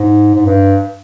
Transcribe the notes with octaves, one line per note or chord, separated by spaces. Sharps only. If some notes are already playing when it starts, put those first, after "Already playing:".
Already playing: G#2
G#2
G2